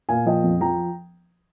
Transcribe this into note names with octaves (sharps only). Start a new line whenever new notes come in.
A#2 F5 G#5
F3 D#5 G5
F2
F3 G5 A#5